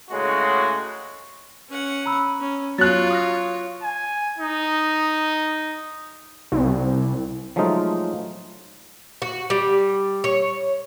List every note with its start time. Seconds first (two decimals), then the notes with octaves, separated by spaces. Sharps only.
0.10 A2 C#3 G#3 C#4 F#4
1.70 C#4 F#5
2.06 A#5 B5 E6
2.41 C#4
2.78 F#3 F4 C#5 F#6 A6
3.10 D#6 F6 A#6
3.83 G#5
4.38 D#4
6.52 C2
7.56 F3 F#3 G#3 A3 D#4 F4
9.22 F#4
9.50 G3
10.24 C#5